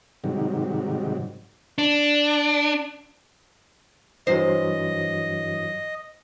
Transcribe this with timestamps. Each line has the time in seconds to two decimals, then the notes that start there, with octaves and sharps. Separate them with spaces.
0.24 G#2 C3 D#3 F#3 G3
1.78 D4
4.27 G2 E3 F#3 C5 D#5